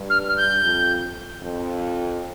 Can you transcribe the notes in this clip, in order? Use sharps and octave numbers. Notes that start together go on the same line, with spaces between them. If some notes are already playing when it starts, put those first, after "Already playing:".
Already playing: G2
F6
F6
G6
F2
F2